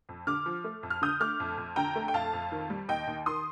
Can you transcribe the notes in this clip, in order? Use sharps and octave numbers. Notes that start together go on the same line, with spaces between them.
F2
D3 D6 F6
F3
A3
F2
F6
D3 D#6 G6
A3 D6 F6
F2
F2
D3 G5 A#5
A3
G5
F2 F5 A5
F2
D#3
G3
D#2 D#5 G5
D#2
D#3 C6 D#6